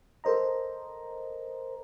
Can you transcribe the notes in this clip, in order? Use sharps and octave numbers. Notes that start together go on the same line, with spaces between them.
A4 A#4 C5 D#5 A#5